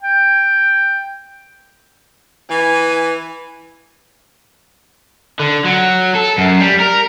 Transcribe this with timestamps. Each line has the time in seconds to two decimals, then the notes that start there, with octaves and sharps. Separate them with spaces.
0.03 G5
2.51 E3 G#5
5.40 D3
5.65 F#3
6.15 A4
6.38 F#2
6.60 G3
6.81 A#4